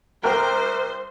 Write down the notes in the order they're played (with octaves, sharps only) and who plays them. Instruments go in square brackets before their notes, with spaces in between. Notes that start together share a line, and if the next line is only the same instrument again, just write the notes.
[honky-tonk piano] C2 A#4 G5 [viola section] C5